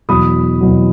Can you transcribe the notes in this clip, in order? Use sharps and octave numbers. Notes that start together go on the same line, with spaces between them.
E2 B2 F#3 B5 D#6
E2 B2 F#3